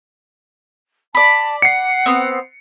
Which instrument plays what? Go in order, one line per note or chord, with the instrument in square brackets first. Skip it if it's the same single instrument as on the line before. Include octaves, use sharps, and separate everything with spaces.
[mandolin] D5 B5 [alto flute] A5
[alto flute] F#5 [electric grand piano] C7 C#7
[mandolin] B3 C4